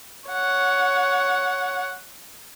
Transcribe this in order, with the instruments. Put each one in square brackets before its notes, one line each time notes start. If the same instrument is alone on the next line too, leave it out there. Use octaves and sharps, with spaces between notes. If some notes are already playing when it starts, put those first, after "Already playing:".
[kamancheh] C#5 F#5